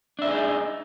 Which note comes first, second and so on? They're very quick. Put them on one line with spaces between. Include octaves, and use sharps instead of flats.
D4 E5 B4 G#4 D#4